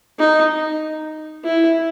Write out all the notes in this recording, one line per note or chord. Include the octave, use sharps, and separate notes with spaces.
D#4
E4